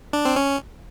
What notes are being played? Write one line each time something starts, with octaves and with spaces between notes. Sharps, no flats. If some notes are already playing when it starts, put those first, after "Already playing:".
D4
C4
C#4